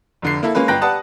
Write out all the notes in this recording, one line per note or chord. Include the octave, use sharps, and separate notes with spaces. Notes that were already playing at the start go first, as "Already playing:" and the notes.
F1 D3 C7
A#3 E4 A4
G#3 A#3 C#4 B4
G1 B4 G5 F#6 A#6
G4 B4 D5 F#5 A5 D#6